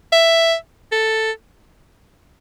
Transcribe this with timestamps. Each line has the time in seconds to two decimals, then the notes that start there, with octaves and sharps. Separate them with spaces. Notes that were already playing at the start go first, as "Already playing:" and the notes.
0.12 E5
0.92 A4